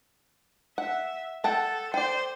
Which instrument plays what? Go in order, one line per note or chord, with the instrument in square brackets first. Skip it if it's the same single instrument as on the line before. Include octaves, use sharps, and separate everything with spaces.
[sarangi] E5 [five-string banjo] F#5
[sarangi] A4 [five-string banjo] F#5 G5 A5
[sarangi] C5 [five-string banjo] D5 G5